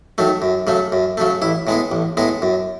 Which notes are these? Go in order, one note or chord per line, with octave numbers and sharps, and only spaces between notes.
D#3 F#3 A3
F#2
C#3 F#3 A3
F#2
C#3 F#3 A3
A1 E4
A2 G#3 B3
A1
A2 G#3 B3
F#2